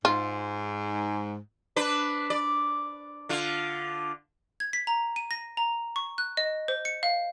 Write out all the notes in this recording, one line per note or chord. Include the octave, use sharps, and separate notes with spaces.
G#2 F4
D4 B4
D5
D3 F4
G#6
B6
A#5
D#7
A#6
A#5
C#6
F#6
D#5
C5
C#7
F5